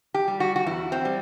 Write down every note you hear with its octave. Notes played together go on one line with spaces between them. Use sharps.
G4
G3
F#4
F#4
E2 E4
C4
G3